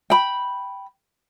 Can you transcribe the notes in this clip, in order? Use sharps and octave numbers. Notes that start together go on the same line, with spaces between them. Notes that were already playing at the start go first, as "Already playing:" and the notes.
G5 B5